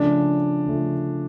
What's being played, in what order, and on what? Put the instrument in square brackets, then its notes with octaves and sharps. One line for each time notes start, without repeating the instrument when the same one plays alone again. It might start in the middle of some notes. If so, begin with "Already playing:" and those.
Already playing: [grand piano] C#3 F3 A3 F4 [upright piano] D4
[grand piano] C#3 F3 A3 F4